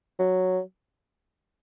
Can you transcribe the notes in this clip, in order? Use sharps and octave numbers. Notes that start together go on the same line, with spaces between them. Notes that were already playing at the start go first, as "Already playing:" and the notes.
F#3